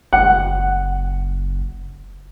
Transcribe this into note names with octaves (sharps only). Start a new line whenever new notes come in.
F#1 F#5